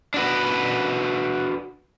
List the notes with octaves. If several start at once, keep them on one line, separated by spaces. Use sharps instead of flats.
D4 F#4 B4